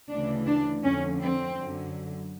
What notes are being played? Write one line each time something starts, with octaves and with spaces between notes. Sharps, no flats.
D2 C#3 E3 D4
D4
F2 D3 F3 C#4
C4
F#2 D3 F#3